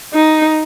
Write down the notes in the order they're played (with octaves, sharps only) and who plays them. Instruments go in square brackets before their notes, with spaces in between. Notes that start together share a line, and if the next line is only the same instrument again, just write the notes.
[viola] D#4